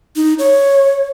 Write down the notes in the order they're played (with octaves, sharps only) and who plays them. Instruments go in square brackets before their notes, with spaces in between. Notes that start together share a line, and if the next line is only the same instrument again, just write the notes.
[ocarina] D#4
C#5